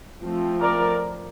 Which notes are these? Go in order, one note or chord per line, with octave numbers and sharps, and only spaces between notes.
F3 A3 C4
A#4 D5